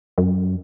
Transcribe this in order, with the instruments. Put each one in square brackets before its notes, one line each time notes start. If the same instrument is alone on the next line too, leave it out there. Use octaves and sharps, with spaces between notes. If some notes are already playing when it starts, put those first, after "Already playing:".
[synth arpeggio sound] F#2